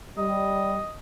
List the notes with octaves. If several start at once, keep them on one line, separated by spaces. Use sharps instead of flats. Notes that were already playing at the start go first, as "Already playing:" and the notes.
G3 D#5